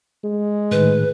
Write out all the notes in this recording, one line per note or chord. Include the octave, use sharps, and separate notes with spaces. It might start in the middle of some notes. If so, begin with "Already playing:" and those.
G#3
A2 D#3 B4